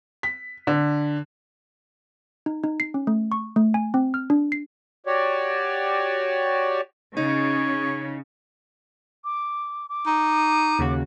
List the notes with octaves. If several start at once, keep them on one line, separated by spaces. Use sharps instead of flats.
B6
D3
D#4
D#4
C7
C#4
A3
C#6
A3
G#5
C4
F6
D4
C7
F#4 G4 C#5 D5
C#3 D#4 C#5
D6
D6
D#4
D#2 C#3 F#4